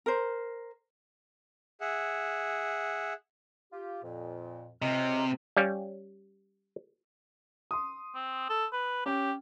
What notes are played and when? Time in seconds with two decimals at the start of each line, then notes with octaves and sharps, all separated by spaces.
0.06 A#4 C5
1.81 G#4 E5 F#5
3.73 F4 G4
4.03 F2 A#2
4.82 C#2 C3 D#5 F6
5.57 G3 C#4 F5
7.71 C6 D#6
8.15 C4
8.50 A4
8.73 B4
9.06 C#4 G4 G5